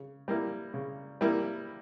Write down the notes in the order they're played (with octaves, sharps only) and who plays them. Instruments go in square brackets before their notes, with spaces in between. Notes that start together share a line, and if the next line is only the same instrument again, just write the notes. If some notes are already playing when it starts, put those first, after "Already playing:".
Already playing: [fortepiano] C#3
G3 A#3 E4
C#3
G3 A#3 E4